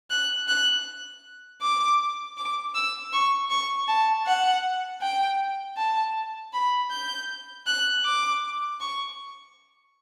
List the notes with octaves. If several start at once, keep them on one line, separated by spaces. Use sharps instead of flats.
F#6
F#6
D6
D6
E6
C#6
C#6
A5
F#5
G5
A5
B5
G6
F#6
D6
C#6